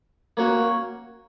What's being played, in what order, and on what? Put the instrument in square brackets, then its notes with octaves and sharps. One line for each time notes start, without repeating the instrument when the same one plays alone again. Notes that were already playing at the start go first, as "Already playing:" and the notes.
[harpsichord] A#3 C#4 F#4 A#4